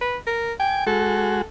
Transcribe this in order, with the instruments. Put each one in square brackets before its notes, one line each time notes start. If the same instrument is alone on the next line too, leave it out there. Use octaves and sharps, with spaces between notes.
[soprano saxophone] B4
A#4
[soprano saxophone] G5 [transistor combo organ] G#5
[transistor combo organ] G#3 F#4 [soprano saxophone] A4